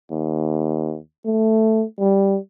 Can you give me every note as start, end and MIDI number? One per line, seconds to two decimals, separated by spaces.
0.11 0.99 39
1.25 1.85 57
1.99 2.38 55